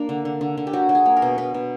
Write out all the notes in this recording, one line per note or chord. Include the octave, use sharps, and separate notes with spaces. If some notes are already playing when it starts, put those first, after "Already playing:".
Already playing: A#3 D4
D3
D3
D3
D3
G4
F#3 F#4
F#3
G#4
A#3
A#4
B2
B2 B4
B2